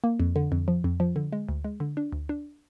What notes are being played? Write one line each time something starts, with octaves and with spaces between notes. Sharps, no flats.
A#3
F2
D3
F2
F3
F2
F3
D3
G#3
D2
G#3
D3
D4
D2
D4